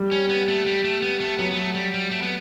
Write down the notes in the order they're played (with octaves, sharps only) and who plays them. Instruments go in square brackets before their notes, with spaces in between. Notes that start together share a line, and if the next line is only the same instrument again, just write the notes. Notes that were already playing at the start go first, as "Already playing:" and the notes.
Already playing: [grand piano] G3
[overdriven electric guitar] C#4
B3
A3
G3
A3
B3
A3
[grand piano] F#3 [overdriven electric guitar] B3
[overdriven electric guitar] B3
A3
G3
G3
A3
B3